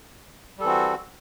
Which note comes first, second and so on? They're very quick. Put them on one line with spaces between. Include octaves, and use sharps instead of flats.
G3 A4 E3 C4 F#4